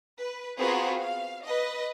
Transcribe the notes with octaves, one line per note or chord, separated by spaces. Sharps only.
B4
B3 C4 F4 F#4 G#4 A#4
F5
B4 D#5